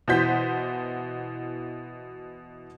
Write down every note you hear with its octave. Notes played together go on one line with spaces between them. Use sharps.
B2 E3 F#4 C5 G6 B6